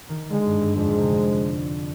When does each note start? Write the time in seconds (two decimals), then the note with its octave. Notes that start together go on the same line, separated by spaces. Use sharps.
0.09 D#3
0.31 D3 G#3
0.46 G2
0.61 G2
0.76 F2 G#3
0.88 G#2
0.99 C3
1.10 D3